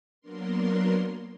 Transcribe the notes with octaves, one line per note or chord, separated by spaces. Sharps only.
F#3 A#3 B3 D4 A#4 C6